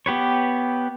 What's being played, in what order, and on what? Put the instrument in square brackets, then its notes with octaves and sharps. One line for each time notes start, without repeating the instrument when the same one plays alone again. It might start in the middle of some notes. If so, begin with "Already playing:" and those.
[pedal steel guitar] B3 G4 B4 C#5